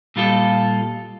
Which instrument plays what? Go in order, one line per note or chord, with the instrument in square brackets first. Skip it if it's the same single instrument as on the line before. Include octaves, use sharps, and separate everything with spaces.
[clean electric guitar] A#2 G3 F4 A4 D#5